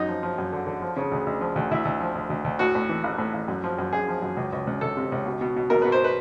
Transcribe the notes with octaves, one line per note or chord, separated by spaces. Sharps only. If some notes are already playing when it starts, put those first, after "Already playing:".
Already playing: F#2 D#4
F3
F3
F#2
D3
D3
F3
C#3
D2
D2
F3
D2
D2 E4
D2
F3
D2
D2
D2
A2 F#4
A2
E3
A1
A2
A1
F#2
F3
F#2
F#2 G#4
F3
F#2
C#2
C#2
C#2
C#2 A4
C3
C#2
B2
B2
B2
B2 A#4
B4
B2
C5
B4